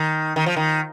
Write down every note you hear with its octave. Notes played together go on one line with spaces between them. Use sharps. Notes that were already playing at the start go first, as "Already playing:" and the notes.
Already playing: D#3
D#3
F3
D#3